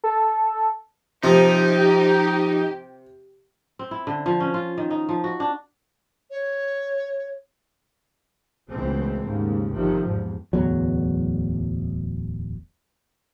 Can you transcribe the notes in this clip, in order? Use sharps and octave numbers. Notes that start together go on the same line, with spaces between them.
A4
C3 F3 D#4 G4
C4
E4
D3
F3
C#4
F4
D#3
D#4
F3
F#4
D4
C#5
C#2 B2 E3 G#3 A3 C4
D#2 G#2 C#3
G1 C3 D#3 F3
E2 G#2 C3
D1 E2 F#3